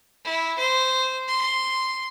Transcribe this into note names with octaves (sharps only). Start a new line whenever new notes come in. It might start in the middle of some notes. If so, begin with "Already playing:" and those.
E4
C5
C6